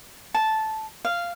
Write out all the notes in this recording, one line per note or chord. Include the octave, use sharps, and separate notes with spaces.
A5
F5